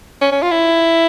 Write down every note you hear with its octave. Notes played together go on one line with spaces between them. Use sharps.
C#4
C#4
F4
E4